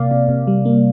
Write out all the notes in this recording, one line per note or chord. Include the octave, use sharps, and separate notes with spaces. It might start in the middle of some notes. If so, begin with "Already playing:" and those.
Already playing: C3 A#3 D5 F5
C3
C3
G3
A#3